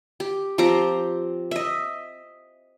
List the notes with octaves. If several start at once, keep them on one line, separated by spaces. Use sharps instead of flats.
G4
F3 C4 G4 A#5
D#5 E5